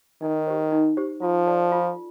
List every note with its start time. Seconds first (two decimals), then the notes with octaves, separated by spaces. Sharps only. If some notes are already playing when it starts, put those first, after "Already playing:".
0.22 D#3 D#4
0.47 G4 C5
0.72 D#4
0.97 G4 C5
1.22 F3 F4
1.47 A4 D5 A5
1.72 F4